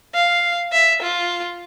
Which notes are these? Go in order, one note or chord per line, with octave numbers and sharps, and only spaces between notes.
F5
E5
F4